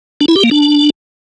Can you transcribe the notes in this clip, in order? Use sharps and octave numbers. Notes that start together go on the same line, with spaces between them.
D4
E4
G4
A#3
D4